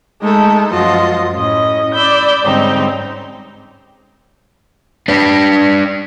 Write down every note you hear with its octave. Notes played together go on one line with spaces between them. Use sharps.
G#3 A3 D#4 A4
F#2 F3 F#3 F4 D#5
A2 C#4 D#5
D5 B5 E6 G6
G#2 D3 G3 C4 C#4 D#4
D4 B4 D5